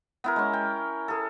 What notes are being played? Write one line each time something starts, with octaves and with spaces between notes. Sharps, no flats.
B3 E4 A#4
G#3 C#4
G5
G#4 A4